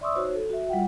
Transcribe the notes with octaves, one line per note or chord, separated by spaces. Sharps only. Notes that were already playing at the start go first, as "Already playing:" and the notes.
D5 E5 C6 C#6 D#6 E6
D#4 F#4 C5 C#5
A4
F#4 E5
G3 F4 F#5 G5